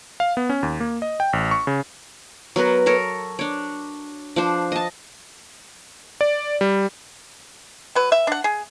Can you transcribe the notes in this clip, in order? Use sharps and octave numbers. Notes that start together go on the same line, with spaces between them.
F5
B3
C#4
D#2
A#3
D#5
G5
A1
C#6
C#3
F#3 B3 A#4 B4
A4 A#4 C#5
D4 C#5
F3 D4 C5
D#5 A5
D5
G3
F#3 B4
E5
D4 F#5
G#4